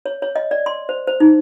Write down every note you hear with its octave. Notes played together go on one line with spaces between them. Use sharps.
C#5
C#5
D#5
D5
C6
C5
C5
D#4